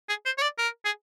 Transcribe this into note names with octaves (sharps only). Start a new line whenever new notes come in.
G#4
C5
C#5
D5
A#4
G#4